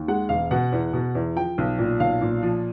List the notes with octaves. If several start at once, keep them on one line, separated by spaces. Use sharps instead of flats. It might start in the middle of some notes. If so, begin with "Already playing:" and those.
Already playing: D#2
G#3 F#5
E1 F5
B2 F#5
E2
B2
E2
F3 G5
B1
A#2
B1 F5
A#2
F3